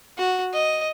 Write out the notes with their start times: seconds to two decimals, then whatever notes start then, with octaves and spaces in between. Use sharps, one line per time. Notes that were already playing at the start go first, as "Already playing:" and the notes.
0.18 F#4
0.54 D#5